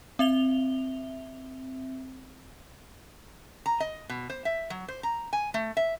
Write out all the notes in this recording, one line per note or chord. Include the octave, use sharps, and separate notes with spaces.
C4 E5 F7 G7
A#5
D#5
B2
C5
E5
F#3
C5
A#5
G#5
A3
E5